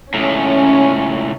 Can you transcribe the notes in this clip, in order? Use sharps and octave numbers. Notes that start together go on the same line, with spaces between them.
C#2 A2 C#4